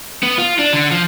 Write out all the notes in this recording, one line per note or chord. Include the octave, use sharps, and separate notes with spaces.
B3
F4
D4
D3
F3